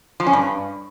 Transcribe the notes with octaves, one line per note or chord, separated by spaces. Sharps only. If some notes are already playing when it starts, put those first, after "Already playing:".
F3
C#4
G2